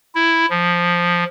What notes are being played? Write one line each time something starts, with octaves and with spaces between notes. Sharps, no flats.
E4
F3